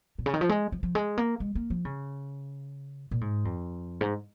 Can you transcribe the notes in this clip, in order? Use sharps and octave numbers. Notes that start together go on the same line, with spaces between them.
A#2
C#3
D#3
F3
G#3
F3
F3
G#3
A#3
G#3
A#3
F3
C#3
A#2
G#2
F2
G#2